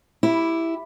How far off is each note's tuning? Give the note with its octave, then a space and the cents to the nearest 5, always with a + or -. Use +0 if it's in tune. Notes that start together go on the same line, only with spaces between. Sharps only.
E4 +0 G4 +0